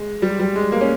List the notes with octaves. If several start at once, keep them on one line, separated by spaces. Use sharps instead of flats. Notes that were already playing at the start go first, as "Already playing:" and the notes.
Already playing: G#3
G3
G3
G#3
A#3
C#4